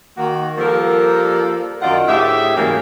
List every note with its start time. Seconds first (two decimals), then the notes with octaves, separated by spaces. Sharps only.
0.18 D#3 A#3 F#4
0.58 F3 G3 A#3 A4 A#4 D5
1.82 F#2 D#3 F4 D5 D#5 F#5
2.08 D2 A2 G4 G#4 E5
2.56 G#2 C#3 E3 F#3 A#3